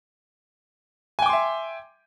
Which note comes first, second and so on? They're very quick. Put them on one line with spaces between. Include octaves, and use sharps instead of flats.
G#5 G5 D6 C6 E5